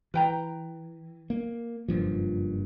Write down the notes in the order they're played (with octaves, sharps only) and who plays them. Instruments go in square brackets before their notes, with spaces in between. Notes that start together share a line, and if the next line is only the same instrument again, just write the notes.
[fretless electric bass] E3 [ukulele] B4 G5 A#5
[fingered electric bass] A#3
[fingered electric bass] F#1 G2 A#2 [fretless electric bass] F3